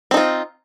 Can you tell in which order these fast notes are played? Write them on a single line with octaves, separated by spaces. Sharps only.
C4 D#4 F4